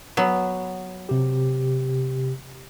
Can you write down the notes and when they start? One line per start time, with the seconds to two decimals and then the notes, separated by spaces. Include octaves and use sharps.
0.17 F#3 B3
1.09 C3 G4